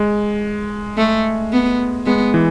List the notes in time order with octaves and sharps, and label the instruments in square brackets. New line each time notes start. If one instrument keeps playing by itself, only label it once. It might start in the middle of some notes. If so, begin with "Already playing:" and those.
Already playing: [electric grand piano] G#3
[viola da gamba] A3
B3
[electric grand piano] G#3 [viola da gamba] B3
[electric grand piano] E3